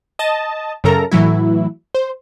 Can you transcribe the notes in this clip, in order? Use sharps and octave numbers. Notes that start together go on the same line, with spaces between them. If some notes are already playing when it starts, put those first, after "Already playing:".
D#5 A5
F#2 C#3 A4 A#4 A#5
A2 E3 F#3 E4
C5